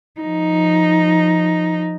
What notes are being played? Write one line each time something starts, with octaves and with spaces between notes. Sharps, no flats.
F3 D#4